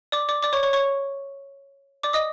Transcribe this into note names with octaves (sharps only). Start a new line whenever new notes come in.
D5 D6
D5 D6
D5 D6
C#5 C#6
C#5 C#6
C#5 C#6
D5 D6
D#5 D#6